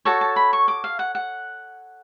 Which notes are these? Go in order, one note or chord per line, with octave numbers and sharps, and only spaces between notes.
F#4 A4 C#5 A5
A5
B5
C#6
D6
F5
F#5
F#5